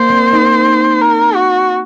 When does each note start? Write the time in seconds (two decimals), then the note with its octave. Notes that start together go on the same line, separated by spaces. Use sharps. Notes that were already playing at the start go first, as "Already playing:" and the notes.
Already playing: A#3 C5
0.09 C4
0.32 D#4
1.01 A#4
1.36 F#4